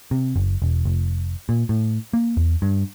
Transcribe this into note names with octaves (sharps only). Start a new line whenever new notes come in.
C3
F#1
E1
F1
A#2
A2
A#3
E2
G2